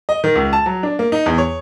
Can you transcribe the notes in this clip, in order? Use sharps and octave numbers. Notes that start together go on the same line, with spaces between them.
D#5
D#3
C#2
A5
F#3
D4
A#3
D#4
E2
C#5